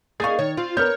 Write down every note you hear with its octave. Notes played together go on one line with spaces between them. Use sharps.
A#3 D#4 G#4 F5 C#6 A6
D#3 C#5
C4 F4
B3 A#4 C#5 F6 G6